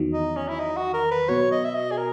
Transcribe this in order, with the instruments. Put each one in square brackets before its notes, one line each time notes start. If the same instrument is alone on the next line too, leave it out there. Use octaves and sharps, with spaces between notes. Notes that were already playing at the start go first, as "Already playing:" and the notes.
Already playing: [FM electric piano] E2 D#3 F#3
[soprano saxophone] D#4
C#4
E4
D#4
F#4
A#4
B4
[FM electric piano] B2 F#3 B3 F#4 [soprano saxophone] C#5
[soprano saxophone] D#5
E5
D#5
G#4
A#4